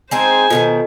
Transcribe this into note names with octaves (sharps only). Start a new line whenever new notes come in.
G#3 C4 D#4 C5 G#5
B2 D3 D#3 F4 A4 D#5